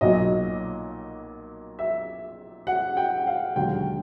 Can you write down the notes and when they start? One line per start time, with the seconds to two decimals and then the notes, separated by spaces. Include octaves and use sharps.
0.01 B1 A#2 F#3 D#5
1.79 E5
2.67 F#5
2.97 G5
3.27 F5
3.56 E1 D#2 D3 F#3 G5